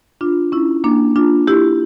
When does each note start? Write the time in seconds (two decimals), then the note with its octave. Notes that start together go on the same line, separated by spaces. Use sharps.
0.21 D4 F4
0.52 C#4 E4
0.84 A#3 D4
1.16 D4 F4
1.47 E4 G4